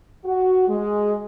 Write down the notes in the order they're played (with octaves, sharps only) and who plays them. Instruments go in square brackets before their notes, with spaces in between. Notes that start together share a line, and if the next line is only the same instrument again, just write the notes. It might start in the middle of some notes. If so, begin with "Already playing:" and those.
[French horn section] F#4
G#3